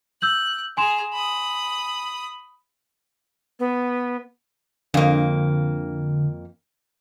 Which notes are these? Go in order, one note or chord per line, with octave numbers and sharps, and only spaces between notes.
E6 F#6 G6 F#7
G#4 G#5 A#5 C6 E7
B5 D#6
B3
F2 D3 A#3